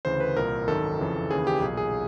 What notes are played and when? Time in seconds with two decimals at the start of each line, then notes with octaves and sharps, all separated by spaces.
0.05 D2 C#3 E3 C5
0.20 B4
0.36 C2 A#2 A#4
0.68 G#1 F#2 D#3 A4
0.99 F2 C#3 E3
1.31 D#2 C#3 E3 G#4
1.47 G4
1.62 B1 A#2 G#4
1.77 G#4